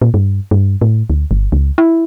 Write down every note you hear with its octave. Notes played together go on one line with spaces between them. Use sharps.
A#2
G2
G2
A2
D2
G1
C#2
E4